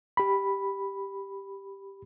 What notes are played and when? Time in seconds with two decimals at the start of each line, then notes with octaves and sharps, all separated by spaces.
0.17 G4 B5